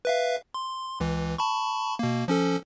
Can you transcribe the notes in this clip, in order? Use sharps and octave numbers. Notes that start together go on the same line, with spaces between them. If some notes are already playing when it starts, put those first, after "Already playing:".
B4 E5 F5
C6
C#2 E3
A5 B5 C#6
B2 A#3
F3 C#4 A4